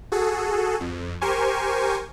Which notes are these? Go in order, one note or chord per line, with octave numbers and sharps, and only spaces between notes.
F#4 G#4 A4
F2
G4 A#4 C5 G#5 C#6